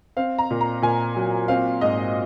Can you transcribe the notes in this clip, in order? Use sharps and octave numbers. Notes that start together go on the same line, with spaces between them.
C4 F5
A#5
A#2
A#5
A#2 G#5
F#3
C4 F5
G#2 D#5